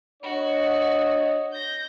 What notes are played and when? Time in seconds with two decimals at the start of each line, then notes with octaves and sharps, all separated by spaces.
0.23 D4 F#4 C#5 D#5
1.52 G6 A#6